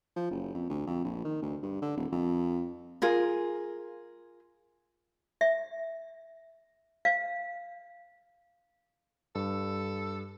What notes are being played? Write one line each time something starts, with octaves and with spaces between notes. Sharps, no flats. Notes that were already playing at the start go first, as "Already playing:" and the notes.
F3
F#1
F2
D2
F2
A#1
D#3
D2
G2
D3
D#1
F2
F4 G#4 A#4
E5
F5
G2 A4